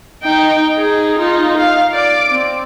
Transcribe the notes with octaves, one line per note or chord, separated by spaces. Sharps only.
D#4 G5
D#4 G#4
D#4 F4
F5
D5 D6
C4